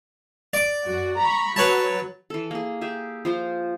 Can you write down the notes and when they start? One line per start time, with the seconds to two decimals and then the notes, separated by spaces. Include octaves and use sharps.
0.54 D5 D6
0.87 F#2 F#4
1.18 A#5 B5 C#6
1.56 F#3 B4 C#5 A5
2.30 E3 A4
2.51 A#3 G#4
2.81 G4 G#4 E5
3.25 F3 F4 C5